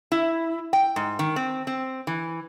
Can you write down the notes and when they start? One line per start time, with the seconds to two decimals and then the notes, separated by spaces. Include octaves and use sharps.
0.12 E4
0.73 G5
0.96 G#2
1.19 D#3
1.36 C4
1.67 C4
2.07 E3